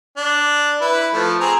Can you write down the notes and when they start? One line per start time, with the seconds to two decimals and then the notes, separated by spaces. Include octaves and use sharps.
0.17 D4
0.81 E4 B4
1.13 F3 A3
1.41 C4 G#4 A#5